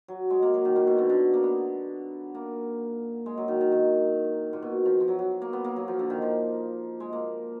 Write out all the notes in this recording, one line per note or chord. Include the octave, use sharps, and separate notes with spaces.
F#3
G#3
A#3
F#3
D#3
A#2
B2
D3
D3
A#3
B3
A#3
G#3
F#3
D#3
D#3
D#3
A#2
B2
F3
F3
F#3
F#3
A#3
B3
A#3
F#3
F3
D3
D#3
F3
G#3
A#3